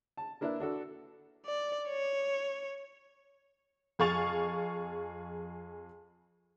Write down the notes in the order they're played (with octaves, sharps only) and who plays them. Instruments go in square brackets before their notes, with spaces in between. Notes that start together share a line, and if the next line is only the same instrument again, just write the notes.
[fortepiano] A5
A#3 D4 E4 B4
D4 F#4 A4
[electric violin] D5
C#5
[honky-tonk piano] F2 G#4 F5 C#6 A6 F7